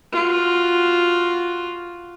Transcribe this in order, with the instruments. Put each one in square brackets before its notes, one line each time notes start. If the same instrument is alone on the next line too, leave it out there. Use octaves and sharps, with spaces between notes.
[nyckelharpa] F4 F#4